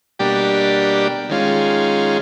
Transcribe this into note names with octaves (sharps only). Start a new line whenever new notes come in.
B2 G3 A#3 D4 G4
D#3 G#3 C#4 F4